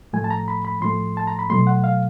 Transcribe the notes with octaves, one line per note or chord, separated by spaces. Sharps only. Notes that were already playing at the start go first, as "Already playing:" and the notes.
A2 F3 A3 G#5
A5
A#5
B5
B5
A2 F3 A3 C6
A5
A#5
B5
B2 F#3 A3 C6
F#5
F5